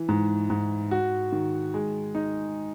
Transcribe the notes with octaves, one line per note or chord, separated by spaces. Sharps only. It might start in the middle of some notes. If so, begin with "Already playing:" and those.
Already playing: E3
G#2
G#2
F#4
D#3
G#3
D#4